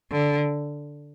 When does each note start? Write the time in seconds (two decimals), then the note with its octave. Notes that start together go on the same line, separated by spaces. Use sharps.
0.12 D3